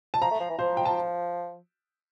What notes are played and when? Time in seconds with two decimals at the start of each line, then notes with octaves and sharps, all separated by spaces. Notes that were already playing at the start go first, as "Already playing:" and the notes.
0.14 A5
0.21 F3 A#5
0.31 A3
0.40 F3
0.50 E3
0.58 F3 C5
0.77 G5
0.85 A5